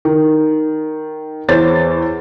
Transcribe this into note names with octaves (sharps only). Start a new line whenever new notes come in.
D#3
E2 C5 C#5 A6